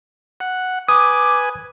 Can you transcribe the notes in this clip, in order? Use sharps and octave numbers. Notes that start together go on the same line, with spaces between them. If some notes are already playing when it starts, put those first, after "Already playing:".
F#5
B4 G#5 D6 D#6